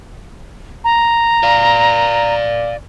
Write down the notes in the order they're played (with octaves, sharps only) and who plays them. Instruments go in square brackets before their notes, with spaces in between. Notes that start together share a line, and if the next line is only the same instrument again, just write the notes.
[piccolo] A#5
[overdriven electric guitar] D5 F5